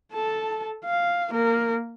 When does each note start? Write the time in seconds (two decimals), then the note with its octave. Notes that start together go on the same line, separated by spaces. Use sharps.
0.13 A4 A5
0.85 F5
1.31 A#3 A#4